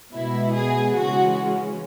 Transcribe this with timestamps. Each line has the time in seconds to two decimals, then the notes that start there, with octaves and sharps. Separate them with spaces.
0.13 B2 G#3 B3 E4
0.54 G#4
0.95 C#3 E3 G#3 C#4 F#4